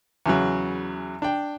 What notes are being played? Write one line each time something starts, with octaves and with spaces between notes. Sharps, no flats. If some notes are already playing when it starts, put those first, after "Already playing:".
E2 C#3 F#3
D4 G5